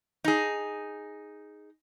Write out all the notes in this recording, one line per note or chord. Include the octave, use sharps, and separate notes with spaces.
D#4 G#4